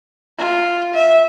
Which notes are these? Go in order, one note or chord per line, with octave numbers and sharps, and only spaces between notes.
F4
E5